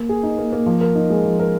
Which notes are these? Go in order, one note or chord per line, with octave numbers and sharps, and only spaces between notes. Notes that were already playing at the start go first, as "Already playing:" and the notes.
Already playing: A#3
G#4
D#4
A#3
A#3
F3
A#4
D#4
G#3
F3
A#4